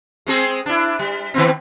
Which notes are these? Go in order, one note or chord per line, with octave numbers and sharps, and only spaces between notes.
G#3 C4 G#4
D4 E4
G3
D#3 B3 C4